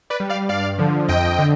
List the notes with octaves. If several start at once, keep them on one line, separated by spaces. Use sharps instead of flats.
B4 D5
G3
D5 F5
G2 D5 F5
D3 F3
F2 D#5 G5
D3